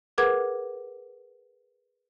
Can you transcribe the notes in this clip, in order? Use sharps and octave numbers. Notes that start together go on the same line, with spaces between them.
G#4 A#4 B4 F#5 D6 G#6